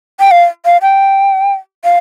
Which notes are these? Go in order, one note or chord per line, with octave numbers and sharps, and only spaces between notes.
G5
F5
F5
G5
F5